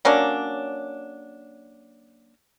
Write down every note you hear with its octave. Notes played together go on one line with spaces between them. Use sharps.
F#3 A#3 C#4 D4